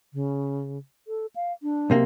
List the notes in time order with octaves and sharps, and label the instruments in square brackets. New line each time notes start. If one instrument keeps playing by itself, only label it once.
[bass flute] C#3
A4
F5
D4
[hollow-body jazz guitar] B1 C3 A#3